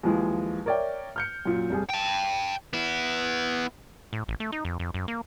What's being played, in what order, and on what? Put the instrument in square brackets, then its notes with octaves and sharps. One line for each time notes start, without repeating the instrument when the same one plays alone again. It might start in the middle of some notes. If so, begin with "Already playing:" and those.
[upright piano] D#2 E3 F3 G#3
A#4 C#5 D5 E5 G5
F6 G6 C#7
F#2 A#2
F1 G3 G#4
[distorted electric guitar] G5 A5
B3 E4
[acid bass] A2
A1
A3
D#4
F2
F2
F#2
A#3